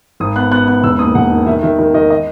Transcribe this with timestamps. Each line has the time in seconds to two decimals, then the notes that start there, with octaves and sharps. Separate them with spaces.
0.20 G#1 D#6
0.36 B3 F#6
0.52 B3 F#6
0.68 B3 F#6
0.83 E1 E6
0.99 D#2 D#6
1.15 E1 F#5
1.31 D#3
1.46 D#3 E5
1.62 D#3 E5
1.79 D#3
1.94 D#3 D#5
2.10 D#5